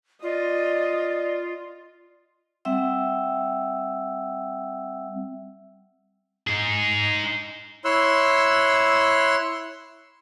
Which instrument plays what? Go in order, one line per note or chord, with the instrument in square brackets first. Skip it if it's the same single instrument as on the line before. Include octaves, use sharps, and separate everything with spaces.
[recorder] F4 [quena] D5 [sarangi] D#5
[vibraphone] G3 C4 E5 F#5 G5 E6
[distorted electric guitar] D#4 G#4
[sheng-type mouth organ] E4 C#5 C6 E6 F#6